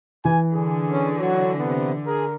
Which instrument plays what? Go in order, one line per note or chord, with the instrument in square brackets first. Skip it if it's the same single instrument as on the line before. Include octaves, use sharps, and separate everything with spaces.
[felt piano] E3 [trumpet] G#5
[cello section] D3 [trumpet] G#4
[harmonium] C#4
[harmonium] F#3 F#4 [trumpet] C#5
[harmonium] C3 [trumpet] B3
[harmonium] G#4 [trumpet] A#4